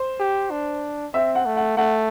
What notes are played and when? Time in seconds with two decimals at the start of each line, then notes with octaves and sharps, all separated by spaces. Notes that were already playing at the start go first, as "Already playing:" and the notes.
Already playing: C5
0.20 G4
0.51 D4
1.14 C4 E5
1.35 F#5
1.46 A3
1.57 F#5
1.77 A3 F#5